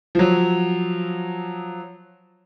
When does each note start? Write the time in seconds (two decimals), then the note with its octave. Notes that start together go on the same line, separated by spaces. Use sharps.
0.15 F3 F#3